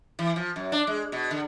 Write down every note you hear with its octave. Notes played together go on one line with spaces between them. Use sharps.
E3
F3
F#2
D4
G#3
B2
D3